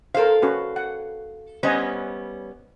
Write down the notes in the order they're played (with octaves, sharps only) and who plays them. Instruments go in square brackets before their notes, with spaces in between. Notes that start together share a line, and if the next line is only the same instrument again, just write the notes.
[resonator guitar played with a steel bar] A4 F5 [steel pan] A#4 C5
[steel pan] C#4 F#4 B4
F#5
[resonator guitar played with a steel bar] G3 B3 C#4 [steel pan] C5 D#5 G#5